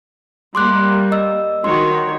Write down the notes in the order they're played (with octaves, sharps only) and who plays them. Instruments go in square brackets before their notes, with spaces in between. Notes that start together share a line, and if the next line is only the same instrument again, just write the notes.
[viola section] G3 A#3 [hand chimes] C6 D6 F#6
[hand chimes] D#5 E6
[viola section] D#3 F#4 C#5 [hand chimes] C6